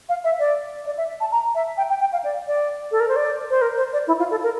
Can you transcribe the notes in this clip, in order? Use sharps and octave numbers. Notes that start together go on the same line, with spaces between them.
F5
E5
D5
D5
E5
A5
A#5
E5
G5
G5
G5
F5
D5
D5
A4
A#4
C5
D5
C5
A#4
C5
D5
E4
F4
A4
A#4